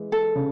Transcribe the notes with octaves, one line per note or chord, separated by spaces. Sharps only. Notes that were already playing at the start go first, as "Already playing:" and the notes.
Already playing: E3 G#3
A4
C#3